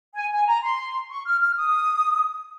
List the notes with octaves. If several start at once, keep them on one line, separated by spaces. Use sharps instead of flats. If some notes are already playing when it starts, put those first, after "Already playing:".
G#5
G#5
A#5
C6
C#6
F6
F6
D#6